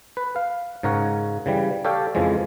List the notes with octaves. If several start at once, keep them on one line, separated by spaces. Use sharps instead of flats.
B4
F5
G#2 C#3 A#4 C#5 F#5
C#3 E3 G3
G4 A4 C#5 D5 F5 G5
F2 C#3 E3 F3 G#3